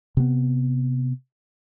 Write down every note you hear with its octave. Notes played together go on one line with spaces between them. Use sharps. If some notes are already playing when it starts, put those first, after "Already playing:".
C3 B3